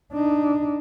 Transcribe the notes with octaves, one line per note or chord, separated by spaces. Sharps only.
D4 D#4